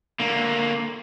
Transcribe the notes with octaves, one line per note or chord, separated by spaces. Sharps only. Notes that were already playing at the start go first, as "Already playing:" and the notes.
D3 A#3